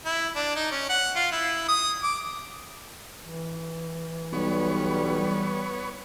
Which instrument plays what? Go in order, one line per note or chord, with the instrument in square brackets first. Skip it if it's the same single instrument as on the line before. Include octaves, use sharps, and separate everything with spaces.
[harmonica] E4
D4
D#4
C#4
F#5
F4
E4
D#6
D6
[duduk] E3
[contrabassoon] B1 [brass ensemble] G3 [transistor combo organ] B3 C#5